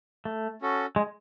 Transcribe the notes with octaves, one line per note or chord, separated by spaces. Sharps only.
A3
C#4 F#4 A4
G#3